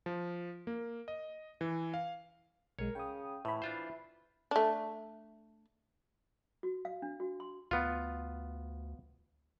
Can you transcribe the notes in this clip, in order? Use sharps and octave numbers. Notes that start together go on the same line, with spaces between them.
F3
A#3
D#5
E3
F5
B1 G#3 A#4 C#5
C#3 G5 D#6
A2 E3 E5 B5
D4 F4 C5
A3 D4
F#4
F5
D4
F#4
C6
D2 B3 F4